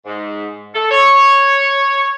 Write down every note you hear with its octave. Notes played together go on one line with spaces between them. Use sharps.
G#2
A4
C#5